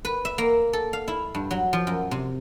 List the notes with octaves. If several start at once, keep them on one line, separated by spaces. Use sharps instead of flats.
B4
E5
A#3
A4
F5
E4
G2
F#3
F3
F#2
C3